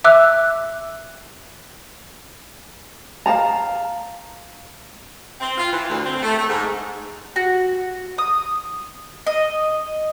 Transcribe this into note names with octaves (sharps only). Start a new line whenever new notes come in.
E5 D6 E6 F#6
F5 G5 A5 A#5
C4
F4
E3
D2
C4
A3
A3
G#2
F#4
D#6
D#5